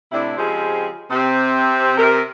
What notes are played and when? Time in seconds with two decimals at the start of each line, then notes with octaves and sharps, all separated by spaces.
0.12 A2 C3 D4 E4
0.37 C#3 F3 G#3 C4 G4 G#4
1.10 C3 C4
1.97 C3 A#4